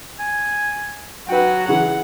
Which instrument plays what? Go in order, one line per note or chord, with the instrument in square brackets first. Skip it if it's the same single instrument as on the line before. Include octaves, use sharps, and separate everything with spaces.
[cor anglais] G#5
[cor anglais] F#3 [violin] F#4 [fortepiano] B4 G5
[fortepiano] C#3 E3 [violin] F#5